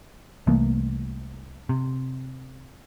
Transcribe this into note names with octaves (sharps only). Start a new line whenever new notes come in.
C2 E3 A3 A#3
C3